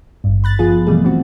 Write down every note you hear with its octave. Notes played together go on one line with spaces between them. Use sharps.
G#1 G2
B5 F#6 A6
F3 B3 F4 G#4
B2 E3 G3 A3 G#4
E3 C4 F#4